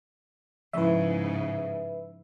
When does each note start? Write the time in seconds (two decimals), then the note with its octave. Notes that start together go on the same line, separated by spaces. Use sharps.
0.73 G#2 C#3 F3 E4 B4 E5